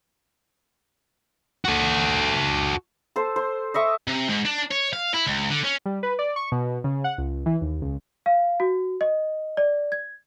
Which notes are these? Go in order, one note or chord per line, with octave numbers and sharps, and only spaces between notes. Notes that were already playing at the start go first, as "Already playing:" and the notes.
F#4 A4
A4 C5
C5
D#5 E5 C#6 D6
C3
G#2
D4
C#5
F5
E4
C#2
D3
C#4
G3
B4
D5
C#6
B2
C#3
F#5
C#2
E3
D#2
C#2
F5
F#4
D#5
D5
G#6